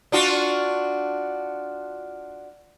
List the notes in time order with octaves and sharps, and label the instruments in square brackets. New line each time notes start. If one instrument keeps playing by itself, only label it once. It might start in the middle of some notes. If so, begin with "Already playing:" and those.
[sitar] D4 F4 F#4